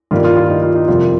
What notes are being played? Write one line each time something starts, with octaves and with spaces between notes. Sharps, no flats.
G2 D#3 G3 A#3 F4
F4
F4
D#4
F4
D#4
F2 C3 G3 A#3 F4